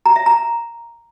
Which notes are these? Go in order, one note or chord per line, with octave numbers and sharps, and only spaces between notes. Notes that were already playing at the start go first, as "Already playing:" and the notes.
A#5
E5
A#5